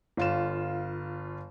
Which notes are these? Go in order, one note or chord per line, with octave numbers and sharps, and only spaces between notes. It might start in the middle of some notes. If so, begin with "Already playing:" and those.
G1 F4 E7